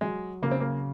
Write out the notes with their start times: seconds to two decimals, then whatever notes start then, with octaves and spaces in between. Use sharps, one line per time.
0.01 F#3 G#3
0.42 C#3 A#3
0.51 C4
0.60 A#3